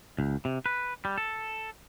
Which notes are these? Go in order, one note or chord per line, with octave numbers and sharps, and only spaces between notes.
C#2
C3
B4
G3
A4